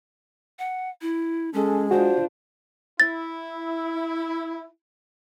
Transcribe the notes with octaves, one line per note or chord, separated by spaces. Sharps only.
F#5
E4
G#3 C#4 A4
D4 F4 F#4 C5
E4 A6